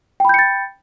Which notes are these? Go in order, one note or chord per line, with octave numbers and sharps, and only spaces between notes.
G5 B5 G6 A6 C#7